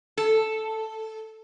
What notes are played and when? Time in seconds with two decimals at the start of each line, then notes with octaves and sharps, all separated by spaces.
0.18 A4